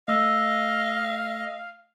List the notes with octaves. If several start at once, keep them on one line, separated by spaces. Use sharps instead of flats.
A3 D#5 F5 E6